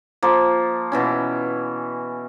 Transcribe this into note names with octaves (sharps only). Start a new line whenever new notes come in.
F3 A#3
B2 E3 C#4